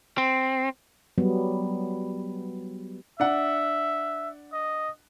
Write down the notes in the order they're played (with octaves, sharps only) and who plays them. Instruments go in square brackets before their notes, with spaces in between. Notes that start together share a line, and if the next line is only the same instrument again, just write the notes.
[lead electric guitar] C4
[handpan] F#3 G3 B3
[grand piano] D4 F#5 [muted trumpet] E5
[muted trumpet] D#5